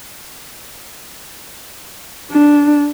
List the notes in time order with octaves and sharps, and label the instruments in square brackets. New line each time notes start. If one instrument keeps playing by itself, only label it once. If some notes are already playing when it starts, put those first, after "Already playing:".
[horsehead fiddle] D4